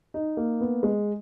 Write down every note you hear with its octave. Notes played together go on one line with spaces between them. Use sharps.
D#4
A#3
B3
G#3